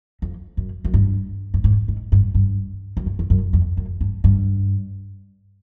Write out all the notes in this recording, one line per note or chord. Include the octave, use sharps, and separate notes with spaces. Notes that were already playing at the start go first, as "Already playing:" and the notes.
F2
F#2
F#2
G2
G2
G#2
G#2
G2
G2
F#2
G2
F2
F#2
F2
F#2
G2
G2